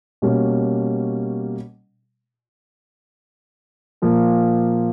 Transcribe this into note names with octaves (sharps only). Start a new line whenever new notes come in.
B2 G3 A#3 C#4
A#2 F3 A#3